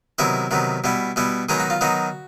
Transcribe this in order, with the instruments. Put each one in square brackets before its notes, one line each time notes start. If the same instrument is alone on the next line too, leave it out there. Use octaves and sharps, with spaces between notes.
[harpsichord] C3 D#3 F#3 B3 E4 E5
C3 D#3 F#3 B3
B2 G3 B3 E4
B2 G3 B3 E4
D#3 F#3 G#3 B3 D#4 G#4
F#4
F4
D#3 F#3 B3 D#4 F#4